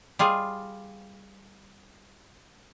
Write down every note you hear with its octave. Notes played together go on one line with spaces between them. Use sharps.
G3 F4 G#4